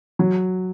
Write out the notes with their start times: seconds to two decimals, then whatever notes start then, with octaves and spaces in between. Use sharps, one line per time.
0.19 F#3